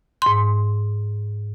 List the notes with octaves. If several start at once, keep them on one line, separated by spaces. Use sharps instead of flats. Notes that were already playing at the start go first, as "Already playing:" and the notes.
G#2 C6